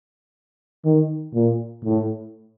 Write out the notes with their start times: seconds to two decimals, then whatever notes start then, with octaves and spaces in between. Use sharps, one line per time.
0.85 D#3
1.34 A#2
1.84 A2